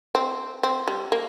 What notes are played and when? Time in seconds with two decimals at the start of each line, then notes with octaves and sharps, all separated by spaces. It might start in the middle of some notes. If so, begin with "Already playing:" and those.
0.15 C4
0.63 C4
0.88 G3
1.12 A#3